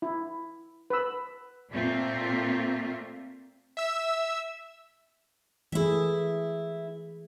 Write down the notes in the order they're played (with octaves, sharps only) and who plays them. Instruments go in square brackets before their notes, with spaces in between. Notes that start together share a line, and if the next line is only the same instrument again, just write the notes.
[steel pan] E4
B4 E6
[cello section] A#2 A3 A#3 C4 F4 E5
[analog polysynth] E5 E6
[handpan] E3 A3 G#4 [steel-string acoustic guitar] E4 E5